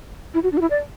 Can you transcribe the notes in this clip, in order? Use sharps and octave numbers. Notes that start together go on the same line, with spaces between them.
E4
F#4
D4
F#4
E4
D5